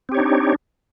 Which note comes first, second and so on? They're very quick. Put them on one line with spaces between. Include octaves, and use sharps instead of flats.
C4 G4 C#5 D#4 D4